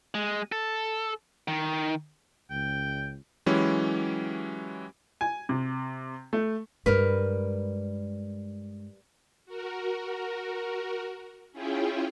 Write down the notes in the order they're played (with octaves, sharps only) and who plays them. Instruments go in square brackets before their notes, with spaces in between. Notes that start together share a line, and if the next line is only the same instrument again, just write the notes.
[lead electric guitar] G#3
A4
D#3
[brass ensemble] C#2 [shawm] G5
[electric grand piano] E3 F#3 G#3 C#4 E4 G4
[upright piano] G#5
C3
A3
[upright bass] G2 G#3 [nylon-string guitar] G3 A#4 B4
[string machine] F#4 A#4
C#4 E4 F4 G#4 G5